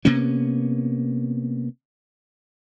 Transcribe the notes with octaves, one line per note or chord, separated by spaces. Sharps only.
C3 A#3 B3 C#4